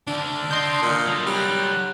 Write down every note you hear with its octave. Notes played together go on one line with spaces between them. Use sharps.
D2 D3 D4
D3 D#5 C6 G6
A#2
F#3 A4
G3 F#5